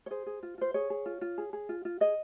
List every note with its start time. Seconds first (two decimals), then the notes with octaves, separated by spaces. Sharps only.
0.06 C#5
0.11 G#4 C5
0.26 G#4
0.43 F4
0.58 F4 C5
0.74 G#4 C#5
0.90 G#4
1.06 F4
1.21 F4
1.38 G#4
1.53 G#4
1.69 F4
1.85 F4
2.01 G#4 D#5